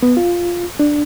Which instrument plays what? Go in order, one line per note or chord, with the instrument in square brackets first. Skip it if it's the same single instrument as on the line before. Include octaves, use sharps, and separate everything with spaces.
[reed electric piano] B3
F4
D4